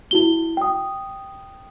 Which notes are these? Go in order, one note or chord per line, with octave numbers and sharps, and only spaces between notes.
E4 F#4 G7
G5 D#6